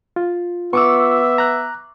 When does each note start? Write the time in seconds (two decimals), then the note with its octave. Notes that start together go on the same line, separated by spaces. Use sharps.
0.16 F4
0.73 B3 E5 C#6 D6 E6
1.38 A#5 F#6